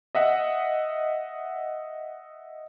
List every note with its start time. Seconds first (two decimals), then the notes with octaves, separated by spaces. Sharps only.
0.15 D#5 E5 F#5